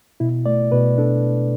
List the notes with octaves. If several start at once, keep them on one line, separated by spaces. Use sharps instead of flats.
B2 E4
A3 D5
B2 B4
D4 A4